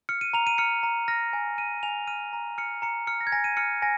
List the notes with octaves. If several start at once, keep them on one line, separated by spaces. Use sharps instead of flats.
F6 C#7
D#7
A#5 F7
D#7
F6 C#7
A#5
F6 A#6
G#5
F6 D#7
G#5 F7
F6 D#7
A#5
F6 C#7
A#5 C#7
F6 C#7
A#6
G#6
G#5 A#6
D#7
F6 C#7
G#5 A#6